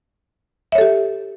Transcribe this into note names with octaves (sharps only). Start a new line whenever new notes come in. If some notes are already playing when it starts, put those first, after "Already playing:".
G4 A4 C#5 E5